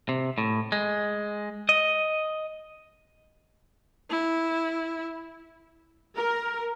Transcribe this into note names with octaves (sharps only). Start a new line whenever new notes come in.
C3
A2
G#3
D#5
E4
A#4